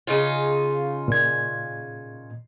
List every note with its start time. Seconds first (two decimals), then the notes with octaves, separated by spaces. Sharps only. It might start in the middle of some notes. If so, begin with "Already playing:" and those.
0.07 C#3 D#4 F4
1.08 A#2 G#6